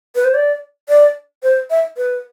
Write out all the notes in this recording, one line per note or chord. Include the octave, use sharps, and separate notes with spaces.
B4
C5
D5
D5
C5
E5
B4